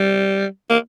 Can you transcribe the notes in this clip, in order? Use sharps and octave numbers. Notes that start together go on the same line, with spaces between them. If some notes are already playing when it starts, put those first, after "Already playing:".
Already playing: G3
A#3